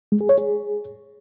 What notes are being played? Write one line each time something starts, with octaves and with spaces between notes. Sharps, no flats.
G#3
G#4
C#5
G#4